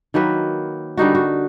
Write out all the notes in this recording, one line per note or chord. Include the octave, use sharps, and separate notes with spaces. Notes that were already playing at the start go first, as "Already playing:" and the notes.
D#3 F#3 A#3 B4
D3 G3 D#4 F#4
F#4